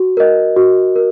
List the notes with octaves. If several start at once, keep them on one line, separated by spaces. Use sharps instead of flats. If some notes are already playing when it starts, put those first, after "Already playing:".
Already playing: F#4
A#4 D#5
F#4
A#4